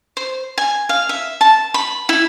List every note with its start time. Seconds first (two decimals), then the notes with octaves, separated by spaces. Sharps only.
0.17 C5
0.58 G#5
0.89 F5
1.09 E5
1.41 A5
1.74 B5
2.09 E4